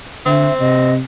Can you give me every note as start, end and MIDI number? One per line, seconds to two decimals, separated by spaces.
0.26 0.48 50
0.26 0.92 60
0.26 0.53 76
0.60 1.00 48
0.60 0.93 75